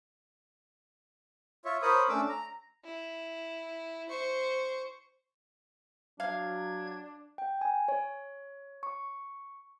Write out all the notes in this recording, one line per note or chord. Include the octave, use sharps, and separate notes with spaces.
F4 C#5 E5
A#4 C5 C#5 B5 D#6
A3 C#4 D4 D6 E6
A#5
E4
C5 C#6
F#3 D4 F5 G#6
G5
G#5
C#5
C#6